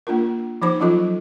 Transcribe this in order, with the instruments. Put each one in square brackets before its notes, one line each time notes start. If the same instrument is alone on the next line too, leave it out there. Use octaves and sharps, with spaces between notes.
[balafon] A#3 D4 F4 A#4
F3 D#4 C5 D6
F3 F#3 C#4 F4 A4 D#5